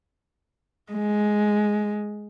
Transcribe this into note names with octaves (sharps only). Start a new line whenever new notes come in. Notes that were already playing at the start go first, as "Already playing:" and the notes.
G#3